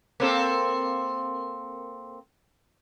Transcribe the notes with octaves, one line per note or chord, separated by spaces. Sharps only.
A#3 C4 A4